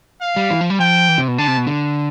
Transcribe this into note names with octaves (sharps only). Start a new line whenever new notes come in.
F5
G3
E3
F3
G3
F3 G5
E3
C3
B2
D3 A5
C3
B2
D3